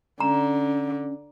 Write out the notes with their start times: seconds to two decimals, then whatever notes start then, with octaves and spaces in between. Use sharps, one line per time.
0.20 D3 C#4 A#5